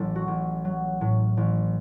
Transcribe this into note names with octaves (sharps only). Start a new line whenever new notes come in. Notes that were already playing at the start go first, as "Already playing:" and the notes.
Already playing: A1 A2 F#3 A4
F#4
A1
F#3
A2
A1